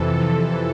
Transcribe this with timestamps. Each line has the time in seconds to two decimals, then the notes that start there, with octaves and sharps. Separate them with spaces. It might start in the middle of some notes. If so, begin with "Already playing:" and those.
Already playing: F2 C3 E3 A4
0.20 F2 C3 E3